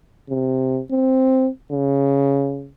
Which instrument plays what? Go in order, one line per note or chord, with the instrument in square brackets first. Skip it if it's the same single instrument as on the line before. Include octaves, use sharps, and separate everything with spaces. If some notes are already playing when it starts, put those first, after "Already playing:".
[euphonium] C3
C4
C#3